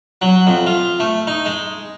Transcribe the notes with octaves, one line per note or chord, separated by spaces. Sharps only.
F#3
F2
F4
A3
D#4
G#3